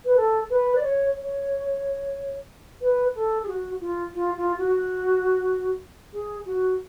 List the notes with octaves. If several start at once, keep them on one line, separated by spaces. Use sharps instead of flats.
B4
A4
B4
D5
C#5
C#5
B4
A4
G#4
F#4
F4
F4
F4
F#4
G#4
F#4